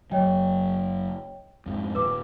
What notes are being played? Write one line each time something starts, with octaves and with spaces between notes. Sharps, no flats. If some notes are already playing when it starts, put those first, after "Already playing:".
F#1 F#3 C#5 D#5 G5
F2 G#2
D#1 B4 D6